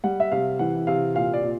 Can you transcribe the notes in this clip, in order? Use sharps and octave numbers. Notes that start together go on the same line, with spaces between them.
G3 F#5
E5
C3 F5
E3 F#5
C3 F5
A#2 F5
D5
A#2